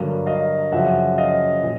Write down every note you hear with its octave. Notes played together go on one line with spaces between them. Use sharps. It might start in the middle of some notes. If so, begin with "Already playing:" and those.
Already playing: G2 D3 F#3 A#3
D#5 F5
F#2 C#3 F3 E5 F#5
D#5 F5
A#2